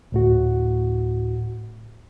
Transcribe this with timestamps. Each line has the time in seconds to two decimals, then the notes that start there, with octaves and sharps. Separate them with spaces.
0.12 D2 A2 F#4